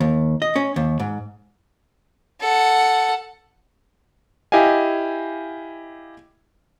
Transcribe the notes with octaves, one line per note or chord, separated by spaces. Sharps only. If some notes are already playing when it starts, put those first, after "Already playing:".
D#2
D#5
C#4
D#2
G#2
A4 F#5
E4 G4 D#5 F5 G#5